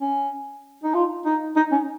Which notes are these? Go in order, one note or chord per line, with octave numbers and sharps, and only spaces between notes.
C#4
D#4
F4
D#4
D#4
C#4